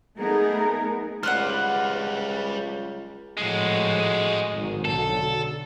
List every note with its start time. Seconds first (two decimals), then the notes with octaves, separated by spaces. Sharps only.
0.17 A3 B3 D#4 G#4 A#4
1.23 C#2 G3 B4 C5 D5 F#5 F6 F#6
3.37 G#1 A2 F3 G#3 F#4
4.52 G#1 G#2 D#3
4.85 B1 D3 F#3 A4